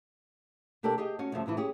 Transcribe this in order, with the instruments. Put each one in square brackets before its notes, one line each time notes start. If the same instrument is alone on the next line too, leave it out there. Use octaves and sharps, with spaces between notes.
[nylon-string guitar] B2 D4 G4 A4 A#4 D5
G4 G#4 D#5 G5
C#4 F#4
D2 G2 C#3 F3 E5
A2 C3 E3 E4
C#4 G4 G#4